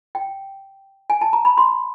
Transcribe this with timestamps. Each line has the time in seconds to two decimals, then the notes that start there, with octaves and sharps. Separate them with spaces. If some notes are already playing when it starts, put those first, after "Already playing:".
0.15 G5
1.10 G#5
1.21 A5
1.33 A#5
1.45 B5
1.57 C6